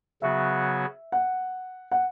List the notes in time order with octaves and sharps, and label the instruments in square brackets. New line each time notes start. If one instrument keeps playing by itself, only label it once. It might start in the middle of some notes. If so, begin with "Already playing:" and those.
[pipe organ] C#3 F#3 B3 F#4 [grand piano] E5
[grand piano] F#5
F#5